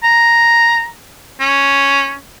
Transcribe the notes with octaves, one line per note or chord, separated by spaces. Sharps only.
A#5
C#4